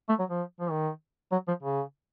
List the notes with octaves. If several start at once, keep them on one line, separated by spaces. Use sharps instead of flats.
A3
F#3
F3
F3
D#3
F#3
F3
C#3